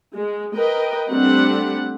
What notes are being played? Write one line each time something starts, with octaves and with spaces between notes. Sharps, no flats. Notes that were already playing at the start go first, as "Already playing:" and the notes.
G#3
A#4 B4 D#5 G5
G3 A3 C4 D4 G4 F#5